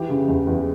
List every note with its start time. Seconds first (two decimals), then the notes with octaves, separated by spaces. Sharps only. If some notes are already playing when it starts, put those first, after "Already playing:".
Already playing: E3 G4
0.09 C#3
0.28 E2
0.47 E2